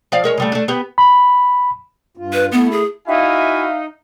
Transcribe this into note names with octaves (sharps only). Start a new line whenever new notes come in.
F3 D5 F5
G#3 A#4 C#5
C#3 G3 A3
A3 D4
B3 G4
B5
G2 F4
B4
A3 B3 E4
G#4
D#4 E4 F#4 E5 F5 G#5